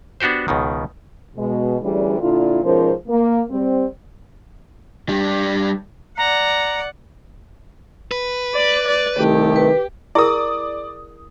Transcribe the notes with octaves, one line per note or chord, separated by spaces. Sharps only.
B3 D4 F#4 G4 C5
C#2 B2 D#3
B2 G#3
D2 E3 G3 C#4 D4 G#4
A#2 D3 E4 F4
G#2 B2 F3 C#4 A#4 C5
A#3
G3 C4
G3 D4
D5 F#5 A#5
B4
D5
D5
C2 D#3 A3 G4
B4
E4 G#4 A#4 D5 D#6